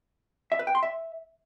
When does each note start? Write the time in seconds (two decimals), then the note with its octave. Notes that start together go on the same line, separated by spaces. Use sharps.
0.52 E5
0.59 B4
0.67 G5
0.75 C6
0.83 E5